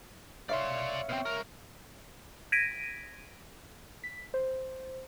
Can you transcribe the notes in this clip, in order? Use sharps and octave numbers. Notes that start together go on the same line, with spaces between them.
C#5 D5 E5 F5 C6
B2 C4
C2 A#4
G#6 A#6 B6 D7 D#7
B6
C5